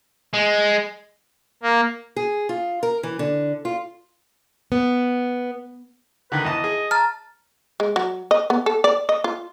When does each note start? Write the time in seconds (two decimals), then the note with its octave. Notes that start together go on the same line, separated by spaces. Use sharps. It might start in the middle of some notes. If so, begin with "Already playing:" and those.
0.33 G#3
1.63 A#3
2.16 G#4
2.49 F4
2.83 A#4
3.03 E3
3.19 D3
3.65 F4
4.72 B3
6.32 D3 D#3 B4
6.45 E2 D#5 A5
6.64 G#4
6.91 A5 A#5 F6 A6
7.80 G#3
7.96 F#3
8.31 D#5
8.50 B3
8.66 A4
8.84 D5
9.09 D#5
9.24 F4